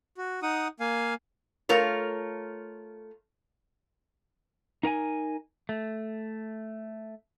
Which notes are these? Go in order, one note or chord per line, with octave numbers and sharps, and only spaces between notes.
F#4
D#4 F#5 D#6
A#3 F5 G#5
A3 F4 A#4 C#5
D#4 A#4 G5 G#5
A3